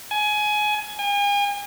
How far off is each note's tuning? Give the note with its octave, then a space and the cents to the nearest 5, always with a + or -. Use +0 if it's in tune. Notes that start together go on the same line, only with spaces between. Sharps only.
G#5 +20
G#5 -40